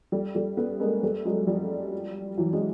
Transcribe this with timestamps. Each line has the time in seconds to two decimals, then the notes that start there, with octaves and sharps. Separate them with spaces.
0.12 G3 A3
0.35 G3 A3
0.57 A3 B3
0.80 G#3 A#3
1.03 G3 A3
1.25 F#3 G#3
1.47 F3 G3
2.37 E3 F#3
2.52 F#3 G#3